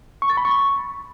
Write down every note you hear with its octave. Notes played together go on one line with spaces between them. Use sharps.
C#6
A6
B5
C#6